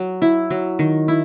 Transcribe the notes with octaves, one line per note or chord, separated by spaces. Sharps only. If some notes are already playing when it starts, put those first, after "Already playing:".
Already playing: F#3
E4
F#3
D#3
E4